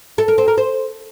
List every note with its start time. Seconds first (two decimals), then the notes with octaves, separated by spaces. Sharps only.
0.18 A4
0.28 A#4
0.38 C4
0.48 A#4
0.58 C5